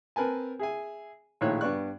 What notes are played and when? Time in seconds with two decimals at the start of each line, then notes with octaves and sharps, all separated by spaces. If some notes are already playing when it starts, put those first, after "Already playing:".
0.16 C4 A#4 B4 G#5 A5
0.59 G#4 E5 G#5
1.41 A#1 A2 D#3 C#5 F#6
1.61 G2 B3 D5 C#6 F#6